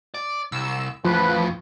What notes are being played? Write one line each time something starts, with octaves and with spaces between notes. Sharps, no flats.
D5
C2 E6
E2 A2 F3 B4